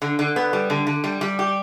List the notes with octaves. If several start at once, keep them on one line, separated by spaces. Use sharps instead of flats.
D3
D3
B3
G3
D3
D3
G3
G3
G4